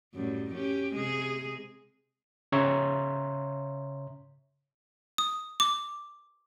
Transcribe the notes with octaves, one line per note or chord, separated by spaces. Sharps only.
F#2 A2 G3
C#4 G4
C3 G#3 G#4
C#3 C#5 E5 A#5 C6
D#6
D6